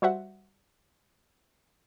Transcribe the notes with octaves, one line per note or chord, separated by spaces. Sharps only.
G3 F#4 C5 E5 F#5